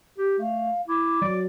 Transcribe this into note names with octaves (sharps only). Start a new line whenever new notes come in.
G4
A3 F5
E4 D6
F#3 D5